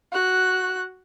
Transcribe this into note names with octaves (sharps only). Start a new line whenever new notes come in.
F#4 F#6